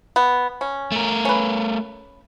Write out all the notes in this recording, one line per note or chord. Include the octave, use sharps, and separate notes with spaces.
B3
C#4
A3 A#4
C#4 B4